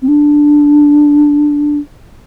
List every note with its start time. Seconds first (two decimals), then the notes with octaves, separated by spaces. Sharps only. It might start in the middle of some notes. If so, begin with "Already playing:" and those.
0.02 C4
0.08 D4